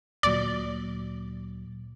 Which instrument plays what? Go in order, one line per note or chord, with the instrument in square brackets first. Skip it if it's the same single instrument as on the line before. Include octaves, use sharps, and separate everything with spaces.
[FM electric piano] D2 A#2 F#3 [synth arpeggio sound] D5